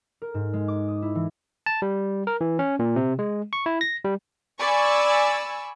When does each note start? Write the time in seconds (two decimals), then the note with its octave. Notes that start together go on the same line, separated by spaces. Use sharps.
0.22 A#4
0.34 G#2
0.54 G#3
0.68 D6
0.88 D#6
1.02 E4
1.15 E3
1.66 A5
1.82 G3
2.27 A#4
2.41 E3
2.59 C#4
2.79 A#2
2.96 C3
3.19 G#3
3.53 C#6
3.66 E4
3.81 A#6
4.04 G3
4.58 D5 G#5 B5 C#6 E6